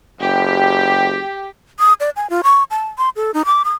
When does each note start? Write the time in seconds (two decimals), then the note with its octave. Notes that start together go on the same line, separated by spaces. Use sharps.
0.20 F#1 G4
1.79 D#6
2.00 D5
2.16 G#5
2.30 F4
2.44 C#6
2.71 A5
2.98 C6
3.16 A4
3.34 D#4
3.46 D6
3.65 D#6